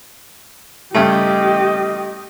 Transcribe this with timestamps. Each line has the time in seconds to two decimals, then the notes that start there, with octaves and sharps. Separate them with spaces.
0.94 G2 C#3 A3 G4 D#5